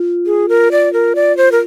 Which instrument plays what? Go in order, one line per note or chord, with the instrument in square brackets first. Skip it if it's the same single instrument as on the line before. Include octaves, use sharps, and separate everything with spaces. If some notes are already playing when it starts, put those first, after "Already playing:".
Already playing: [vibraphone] F4
[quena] G#4
A#4
D5
A#4
D5
C5
A#4